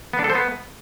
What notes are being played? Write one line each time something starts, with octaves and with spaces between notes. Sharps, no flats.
B3
D4
A4
C5
B3